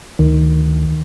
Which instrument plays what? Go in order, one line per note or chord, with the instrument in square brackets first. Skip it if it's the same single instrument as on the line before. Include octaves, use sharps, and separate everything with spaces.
[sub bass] D2 [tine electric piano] D#3